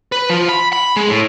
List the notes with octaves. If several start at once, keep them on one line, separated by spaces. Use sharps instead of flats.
B4
F3
B5
B5
G#3
A2